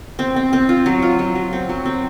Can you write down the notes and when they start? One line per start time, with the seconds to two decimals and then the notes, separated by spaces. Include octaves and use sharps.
0.19 C4
0.36 C4
0.53 C4
0.69 F4
0.86 F#3
1.02 F4
1.19 F#3
1.35 F#3
1.53 C4
1.69 F#3
1.85 C4